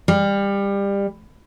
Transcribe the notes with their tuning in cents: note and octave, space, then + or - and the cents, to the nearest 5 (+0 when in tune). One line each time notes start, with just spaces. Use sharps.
G3 +25